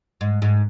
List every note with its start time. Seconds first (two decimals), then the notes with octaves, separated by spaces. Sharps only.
0.21 G#2
0.42 G#2